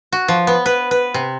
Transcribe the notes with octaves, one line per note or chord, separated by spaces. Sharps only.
F#4
F3
B3
B4
B4
C3